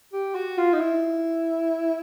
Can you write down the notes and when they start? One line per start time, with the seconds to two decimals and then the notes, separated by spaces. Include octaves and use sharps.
0.13 G4
0.34 F#4
0.58 F4
0.73 D#4
0.80 E4